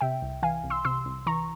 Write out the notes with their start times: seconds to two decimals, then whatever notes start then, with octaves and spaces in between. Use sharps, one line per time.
0.01 C3 E5 G5
0.22 C2
0.43 E3 F5 G#5
0.64 C2
0.70 C6 E6
0.85 C3 C6 E6
1.06 C2
1.27 E3 A#5 C#6